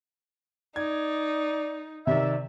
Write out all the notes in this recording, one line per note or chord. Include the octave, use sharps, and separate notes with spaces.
D#4 D5 G#6
C3 D#3 D5 E5